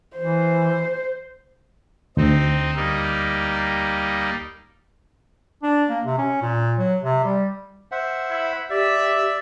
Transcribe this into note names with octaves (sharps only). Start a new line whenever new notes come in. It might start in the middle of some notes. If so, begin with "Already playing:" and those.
E3 C5
D2 C4 D#4
G3 A#3 D#4
D4
A#3
C3
C#4
A#2
F#3
C3
G3
C5 E5 F#5
E4
G4 D5 E5